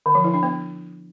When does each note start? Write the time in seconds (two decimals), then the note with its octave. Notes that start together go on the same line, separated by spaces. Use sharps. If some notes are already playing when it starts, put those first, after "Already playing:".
0.06 D3
0.15 F3
0.24 E4
0.34 D4
0.43 B3